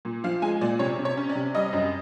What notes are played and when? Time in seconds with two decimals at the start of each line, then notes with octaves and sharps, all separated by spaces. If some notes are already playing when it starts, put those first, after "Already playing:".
0.05 A#2
0.24 F3 F5
0.42 G#3 G#5
0.61 A#2 D5
0.79 C3 C#5
0.98 C3
1.05 C#5
1.17 C#4
1.29 D5
1.35 C3
1.54 G3 D#5
1.73 F#2